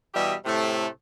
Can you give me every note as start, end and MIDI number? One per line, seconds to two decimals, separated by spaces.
0.14 0.34 47
0.14 0.34 52
0.14 0.34 55
0.14 0.34 67
0.14 0.34 75
0.14 0.34 76
0.45 0.87 45
0.45 0.87 48
0.45 0.87 57